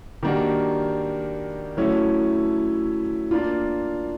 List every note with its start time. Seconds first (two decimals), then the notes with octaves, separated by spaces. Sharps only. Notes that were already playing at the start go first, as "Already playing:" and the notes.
0.23 D#3 G3 A#3 D4 F#4
1.77 F#3 A3 C#4 E4
3.31 A#3 D4 F4